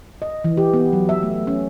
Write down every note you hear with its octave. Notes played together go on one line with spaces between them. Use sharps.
D#5
E3
G4
B3
F#3
E5
A3
C#4